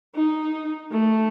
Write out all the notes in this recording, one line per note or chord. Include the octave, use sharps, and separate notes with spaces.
D#4
A3